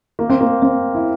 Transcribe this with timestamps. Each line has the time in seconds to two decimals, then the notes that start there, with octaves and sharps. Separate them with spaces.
0.19 A#3
0.30 C4
0.41 A#3
0.62 C4
0.95 E4